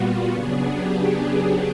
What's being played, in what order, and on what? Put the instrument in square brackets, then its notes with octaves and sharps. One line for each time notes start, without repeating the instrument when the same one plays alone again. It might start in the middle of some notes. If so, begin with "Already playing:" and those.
Already playing: [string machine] A#2 G3 B3 F4 F#4
C#3 F#3 B3 D4 G#4
G4
G4